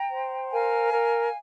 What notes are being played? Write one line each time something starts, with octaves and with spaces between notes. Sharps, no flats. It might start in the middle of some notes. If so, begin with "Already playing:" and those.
Already playing: G5 A#5
C5
A#4 F5 G#5
A#4